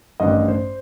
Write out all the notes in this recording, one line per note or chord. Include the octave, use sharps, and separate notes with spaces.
A1 G2 D#3 D#5
C5